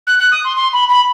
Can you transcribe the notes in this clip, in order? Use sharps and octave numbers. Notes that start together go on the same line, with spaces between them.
F#6
F#6
D#6
C6
C6
B5
B5